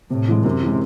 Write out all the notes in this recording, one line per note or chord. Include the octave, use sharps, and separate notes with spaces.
A2 C3
E3 G#3
F#2 C3
E3 G#3